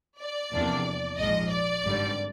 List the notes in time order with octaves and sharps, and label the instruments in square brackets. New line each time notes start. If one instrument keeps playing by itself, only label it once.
[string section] D5
E2 C3 F3 A#3 D4
A#1 G#2 F3 D#5
D5
G#1 G2 D3 G3